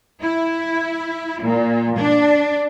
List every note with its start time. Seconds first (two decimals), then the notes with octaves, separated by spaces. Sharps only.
0.21 E4
1.43 A#2
1.98 D4